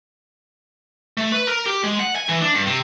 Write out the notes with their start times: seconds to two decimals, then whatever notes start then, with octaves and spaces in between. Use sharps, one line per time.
1.17 A3
1.32 B4
1.48 A#4
1.66 G4
1.83 G#3
2.00 F#5
2.15 G#5
2.29 E3
2.42 D4
2.55 G2
2.66 C3